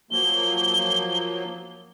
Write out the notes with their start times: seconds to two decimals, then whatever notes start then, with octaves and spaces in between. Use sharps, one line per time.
0.11 F3 F#3 A#3 G7